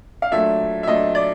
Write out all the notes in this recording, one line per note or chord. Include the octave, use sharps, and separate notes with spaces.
F5
A#2 F#3 A3 D4 E5
E5
A#2 F#3 A3 D4 D#5
D5